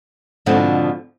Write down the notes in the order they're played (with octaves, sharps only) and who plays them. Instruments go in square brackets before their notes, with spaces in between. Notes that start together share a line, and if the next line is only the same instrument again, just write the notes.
[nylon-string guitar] G#2 B2 D3 F3 B3 C4